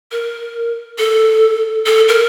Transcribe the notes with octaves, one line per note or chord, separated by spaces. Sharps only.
A#4
A4
A4
A#4